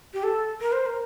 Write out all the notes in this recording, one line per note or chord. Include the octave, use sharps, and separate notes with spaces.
G4
A4
A#4
C5
A#4